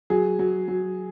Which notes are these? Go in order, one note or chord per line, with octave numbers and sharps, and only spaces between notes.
F#3 G#4
F#3
F#3